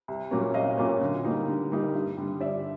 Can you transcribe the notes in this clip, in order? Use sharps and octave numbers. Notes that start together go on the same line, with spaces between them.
C2
A#2 F#3 A#3 C#4
C2 D#5 F5
A#2 F#3 A#3 C#4
D3
G3 A#3 D#4
D3
G3 A#3 D#4
G2
D3 G3
G2 D5 E5